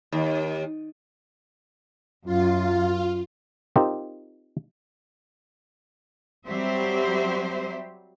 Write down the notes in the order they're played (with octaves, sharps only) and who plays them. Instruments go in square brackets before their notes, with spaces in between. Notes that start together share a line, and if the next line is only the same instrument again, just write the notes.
[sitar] D#2
[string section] F#2 [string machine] F4
[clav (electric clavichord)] C4 D#4 F4 G4 A#4
[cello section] F#3 G3 C4 G4 C5 E5